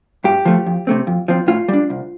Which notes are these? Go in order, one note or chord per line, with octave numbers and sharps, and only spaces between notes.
G2 G4
F3 A3
F2
C3 A3 C4
F2
F3 C4
A2 F4
G3 D4
C2